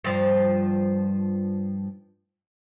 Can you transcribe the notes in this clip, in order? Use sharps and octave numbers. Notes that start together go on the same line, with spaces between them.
G2 F3